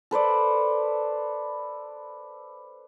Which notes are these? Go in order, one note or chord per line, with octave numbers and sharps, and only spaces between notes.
A4 B4 C5 D5